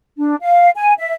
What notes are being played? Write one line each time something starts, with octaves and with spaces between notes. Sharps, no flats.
D4
F5
G#5
E5